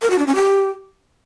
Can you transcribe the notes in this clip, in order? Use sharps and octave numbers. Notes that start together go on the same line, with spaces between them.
A#4
F#4
D4
C#4
G4